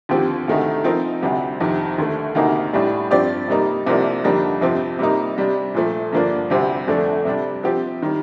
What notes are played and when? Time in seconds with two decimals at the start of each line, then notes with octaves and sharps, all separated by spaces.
0.09 D#2 D3 F3 C4 G4
0.48 D2 C3 D#3 A3 D#4
0.84 F3 C4 D#4 A#4
1.22 D2 C3 G3
1.60 F2 C3 D#3
1.98 D#2 D3 A3
2.35 D2 C3 D#3 A#3 D#4
2.73 A2 G3 D4
3.11 G2 F3 C4 G4 D5
3.48 C3 G3 A#3 D#4
3.86 C2 C3 F3 A#3 D4
4.24 F2 D3 G3 A#3 D#4
4.61 F2 C3 F3 C4
4.99 C3 G3 A#3 D#4
5.37 C3 G3 D4
5.74 A#2 F3 A3
6.12 G2 D3 F3 A#3 D4
6.50 D2 C3 G3 C4
6.88 F2 D3 A3 D4 A4
7.25 C3 G3 D4
7.63 F3 C4 G4
8.02 D#3 G3